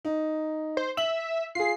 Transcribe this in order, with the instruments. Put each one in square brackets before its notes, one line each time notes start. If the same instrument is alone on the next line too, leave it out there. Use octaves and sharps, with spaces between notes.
[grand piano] D#4
[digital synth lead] C5
[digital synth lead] E5 [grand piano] F#7
[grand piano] F4 G#4 [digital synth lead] C7